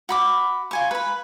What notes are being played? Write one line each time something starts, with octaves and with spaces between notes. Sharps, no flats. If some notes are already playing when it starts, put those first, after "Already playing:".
F#4 B5 D6
F4 G#5 C#6
B4 B5